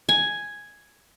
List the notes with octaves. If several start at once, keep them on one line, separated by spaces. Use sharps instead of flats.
G#5